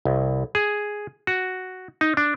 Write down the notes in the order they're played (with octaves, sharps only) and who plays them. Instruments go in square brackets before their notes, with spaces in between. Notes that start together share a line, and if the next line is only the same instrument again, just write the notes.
[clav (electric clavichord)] C2
G#4
F#4
D#4
D4